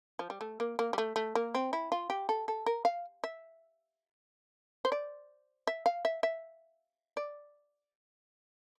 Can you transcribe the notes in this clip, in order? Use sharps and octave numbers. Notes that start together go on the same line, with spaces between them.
F3
G3
A3
A#3
A#3
G3
A3
A3
A#3
C4
E4
F4
G4
A4
A4
A#4
F5
E5
C5
D5
E5
F5
E5
E5
D5